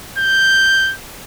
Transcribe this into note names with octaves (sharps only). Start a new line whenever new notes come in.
G6